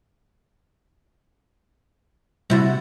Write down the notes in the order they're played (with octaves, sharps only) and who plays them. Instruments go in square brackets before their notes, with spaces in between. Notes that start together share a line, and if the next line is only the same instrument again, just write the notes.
[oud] C3 E4 F#4 [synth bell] G3 A6